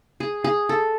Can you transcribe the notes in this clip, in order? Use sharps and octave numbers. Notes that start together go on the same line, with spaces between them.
G#4
G#4
A4